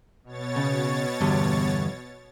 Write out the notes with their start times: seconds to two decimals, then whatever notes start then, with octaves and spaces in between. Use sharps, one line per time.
0.24 B2 C#5 A6
0.56 C#3
1.21 E2 G2 D3